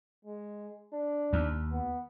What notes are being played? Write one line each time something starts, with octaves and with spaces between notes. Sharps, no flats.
G#3
D4
D#2
B3